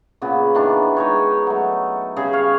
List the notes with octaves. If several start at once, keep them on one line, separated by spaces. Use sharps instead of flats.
A#2 C#3 B3
D#3 E3 D4
G#3 D#4 C#5
F#3 A3
C#3 G3 G#4
C#5 F5